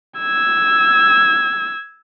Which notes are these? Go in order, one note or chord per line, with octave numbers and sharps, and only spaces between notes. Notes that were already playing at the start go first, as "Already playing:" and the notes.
E6 G#6